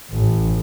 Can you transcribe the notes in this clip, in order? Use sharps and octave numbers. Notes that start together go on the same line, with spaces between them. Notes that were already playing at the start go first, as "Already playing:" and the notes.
A1